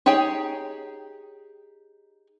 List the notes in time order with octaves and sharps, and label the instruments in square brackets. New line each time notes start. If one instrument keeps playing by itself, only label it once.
[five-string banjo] D#4 G4 G#4 C#5 G5